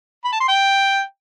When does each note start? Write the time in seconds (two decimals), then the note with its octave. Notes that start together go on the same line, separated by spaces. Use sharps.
0.25 B5
0.33 A5
0.40 C6
0.48 G5